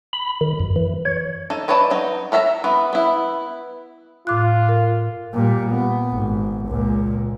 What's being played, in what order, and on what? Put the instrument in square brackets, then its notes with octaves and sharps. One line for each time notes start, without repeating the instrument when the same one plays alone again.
[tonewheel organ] B5
D#3
F#2
E3
C#5
[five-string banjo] D#4 A4
D#4 B4 C#5 D5 A5
F#3 D#4
A4 A#4 E5 A5 A#5
E3 B3
B3 E4
[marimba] A2 D6 F#6 [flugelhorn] F4
[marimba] A#4
[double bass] A#2 G3
B3
G#1
C#2 A#2